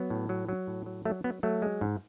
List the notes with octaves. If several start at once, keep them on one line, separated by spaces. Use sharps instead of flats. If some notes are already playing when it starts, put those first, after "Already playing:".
Already playing: F#3 B3
A2
F#3
F#3
A2
F#3
F#3 A3
F#3 B3
F#3 A3
G#3
G#2